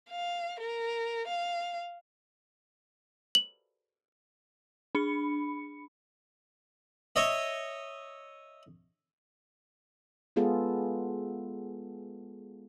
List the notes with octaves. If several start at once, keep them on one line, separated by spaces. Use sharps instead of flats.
F5
A#4
F5
F#7
D4 B5 C#7
C#5 D#5 E5
G#3 B3 F4 G#4 A4